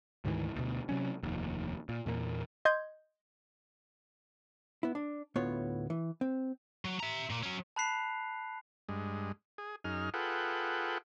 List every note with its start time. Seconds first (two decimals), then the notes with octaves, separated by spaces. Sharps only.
0.25 D2 G#2 D#3 E3
0.56 D2 B2
0.89 C3 F#3 C#4
1.23 F1 D#2
1.89 A#2
2.06 E2 A#2 G#3 A#3
2.65 D#5 C6 G6 G#6
4.83 B3 E4
4.95 D4
5.36 D2 A2 B3 F4 C#5
5.90 E3
6.21 C4
6.85 F#3
7.00 E5 A#5
7.30 A#2 A#3
7.43 F#3 C#4
7.76 A5 B5 F#6 B6 C7 F7
8.89 G2 G#3
9.58 G#4
9.84 F#2 D#4 G#4 F6
10.14 F4 G#4 A4 B4 F#5 G5